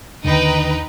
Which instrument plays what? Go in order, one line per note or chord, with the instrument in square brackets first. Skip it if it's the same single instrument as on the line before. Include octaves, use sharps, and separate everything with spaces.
[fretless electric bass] D#2 D3 D#3 [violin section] D#4 B4 G5